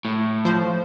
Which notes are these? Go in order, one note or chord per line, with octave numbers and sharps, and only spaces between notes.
A2
F3 C5